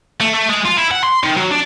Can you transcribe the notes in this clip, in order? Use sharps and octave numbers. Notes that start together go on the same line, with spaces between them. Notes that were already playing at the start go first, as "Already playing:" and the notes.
A3
A3
G#3
F4
E4
F#5
C6
D#3
F#3
D4